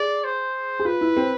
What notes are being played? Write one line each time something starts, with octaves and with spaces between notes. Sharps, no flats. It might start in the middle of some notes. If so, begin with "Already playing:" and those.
Already playing: G#4 D5
C5
G#4
F4 B4
E4
C4